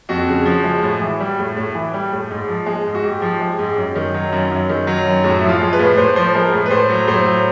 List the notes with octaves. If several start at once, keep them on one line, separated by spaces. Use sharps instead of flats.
F2 F#4
C#3
F3
G#3
A2
E3
G3
A2
A2
E3
G3
A2
G#2
F3
G#3
G#2
F#4
G#2 G4
F3
G#3
G#2
F#2
D#3
F#3
F#2
F#2
D#3
F#3
F#2
A2 F#4
E4
F3
F4
G#3
B4
A2
A2 C5
F3 C5
G#3 A#4
A2
B4
A2 C5
F#3
A2 C5
F#3